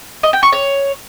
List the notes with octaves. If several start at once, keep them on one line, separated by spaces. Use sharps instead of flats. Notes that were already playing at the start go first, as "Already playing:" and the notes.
D#5
G5
C#6
C#5